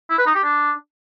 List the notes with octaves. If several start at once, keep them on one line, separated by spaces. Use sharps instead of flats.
E4
B4
D#4
G4
D4